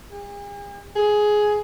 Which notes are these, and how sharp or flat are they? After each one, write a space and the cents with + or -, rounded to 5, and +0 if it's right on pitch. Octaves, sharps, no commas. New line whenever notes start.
G#4 -45
G#4 +10